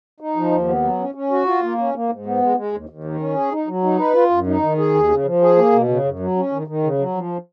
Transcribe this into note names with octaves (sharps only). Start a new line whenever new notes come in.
D#4
F3
D#2
B3
F#3
C#4
C#4
F#4
F4
A#3
C#4
A#3
G#2
B3
G#3
G#3
D#2
D#2
D#3
C#4
G#4
D#4
F#3
D#4
B4
F4
F#2
D#4
D#3
G#4
D#2
C#3
F3
G#4
A#3
B2
C#3
F#2
F#3
C#4
D#3
D#3
C#3
F#3
F3